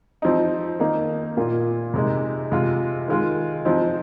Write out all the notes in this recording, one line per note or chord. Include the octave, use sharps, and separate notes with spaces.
F3 C4 D#4
D#3 A#3 D#4
A#2 A#3 F4
C3 G#3 D#4
C3 G#3 F4
D#3 G#3 F4
F3 C4 D#4